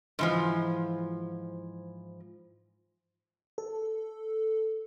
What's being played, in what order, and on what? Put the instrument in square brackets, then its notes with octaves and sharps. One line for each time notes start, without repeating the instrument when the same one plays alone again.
[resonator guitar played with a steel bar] G#2 E3 F3
[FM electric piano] A4